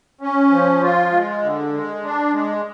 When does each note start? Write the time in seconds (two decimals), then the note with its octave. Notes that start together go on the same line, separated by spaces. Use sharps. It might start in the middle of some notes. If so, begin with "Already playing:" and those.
0.21 C#4
0.51 F3
0.82 F4
1.11 G#3
1.42 D3
1.73 G#3
2.04 D4
2.33 G#3